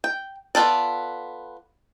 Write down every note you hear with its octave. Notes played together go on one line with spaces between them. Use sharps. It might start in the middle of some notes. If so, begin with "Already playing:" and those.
G5
B3 F4 A4 D5